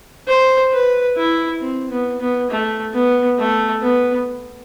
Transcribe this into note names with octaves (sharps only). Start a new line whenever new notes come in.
C5
B4
E4
C4
B3
B3
A3
B3
A3
B3